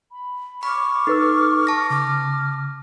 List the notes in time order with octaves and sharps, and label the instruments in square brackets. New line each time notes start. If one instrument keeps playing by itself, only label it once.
[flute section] B5
[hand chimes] B5 [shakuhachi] C#6 [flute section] D6 F6
[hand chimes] D#4 [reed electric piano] A4 B4 E6
[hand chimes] A5 A#6
[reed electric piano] C#3 [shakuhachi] D6 [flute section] F6